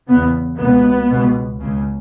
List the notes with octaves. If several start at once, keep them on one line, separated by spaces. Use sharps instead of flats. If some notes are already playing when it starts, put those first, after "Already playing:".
E2 C#3 B3
C#2 B2 B3
C#2 B2
C#2 C#3